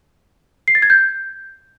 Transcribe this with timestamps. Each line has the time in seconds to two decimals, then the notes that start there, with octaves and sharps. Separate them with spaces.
0.68 C7
0.75 A6
0.82 G#6
0.90 G6